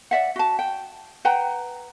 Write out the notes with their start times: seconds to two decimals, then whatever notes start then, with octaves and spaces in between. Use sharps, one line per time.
0.11 D5 E5 F#5
0.36 F#4 A5
0.59 G5
1.25 B4 F#5 G5 A#5